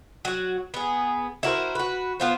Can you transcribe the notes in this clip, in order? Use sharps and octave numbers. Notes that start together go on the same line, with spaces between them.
F#3 F#4
B3 G#4
E4 F#4 A#4 C5
F#4 B4
B3 F4 C5